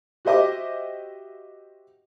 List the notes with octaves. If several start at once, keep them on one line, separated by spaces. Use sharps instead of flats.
F#4 G4 C5 D#5 E5 D6